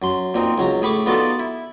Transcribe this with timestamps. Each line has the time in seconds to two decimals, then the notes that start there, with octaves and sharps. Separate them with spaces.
0.02 F#2 C6
0.34 A#2 C4 D#4
0.58 C#2 F#3 A#5
0.82 A2 G#4 B5 C#6 D6
1.06 B3 D#4 F4 F#4 A4 D5
1.40 E4